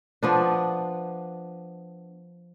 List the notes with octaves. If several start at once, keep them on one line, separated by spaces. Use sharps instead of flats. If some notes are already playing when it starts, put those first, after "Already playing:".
F3 B3 D4